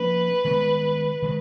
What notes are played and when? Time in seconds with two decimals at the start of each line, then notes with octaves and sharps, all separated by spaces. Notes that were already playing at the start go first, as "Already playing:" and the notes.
Already playing: F3 A#3 C#4 B4
0.45 D#3 G#3 B3
1.22 D#3 G#3